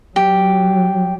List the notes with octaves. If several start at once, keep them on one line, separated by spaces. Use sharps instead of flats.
F#3 G4